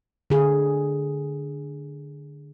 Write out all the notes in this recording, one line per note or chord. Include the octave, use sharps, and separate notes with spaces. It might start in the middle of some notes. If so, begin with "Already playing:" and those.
D3 G#4